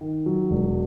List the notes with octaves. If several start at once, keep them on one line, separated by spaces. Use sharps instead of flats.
D#3
F#3
E1